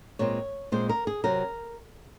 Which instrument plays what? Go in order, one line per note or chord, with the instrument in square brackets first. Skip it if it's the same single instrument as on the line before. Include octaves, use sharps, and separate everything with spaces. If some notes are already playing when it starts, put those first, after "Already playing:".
[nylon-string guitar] A#2 G#3 C4 C#5
A#2 G#3 C4 C5
A#4
G#4
C3 F#3 C4 A#4